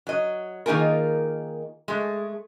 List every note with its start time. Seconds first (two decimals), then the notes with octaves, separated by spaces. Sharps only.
0.07 F#3 D#5
0.66 D#3 A#3 D#4 F4 G#4 A#4
1.88 G#3 A3